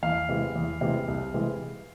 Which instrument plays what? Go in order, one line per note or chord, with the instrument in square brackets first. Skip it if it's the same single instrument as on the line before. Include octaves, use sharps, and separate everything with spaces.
[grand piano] E2 F5
C3 E3 G#3
E2
C3 E3 G#3
C2
C3 E3 G#3